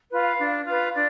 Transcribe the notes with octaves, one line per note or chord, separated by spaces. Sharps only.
F4 B4
F5
D4
F4 B4
D4 D5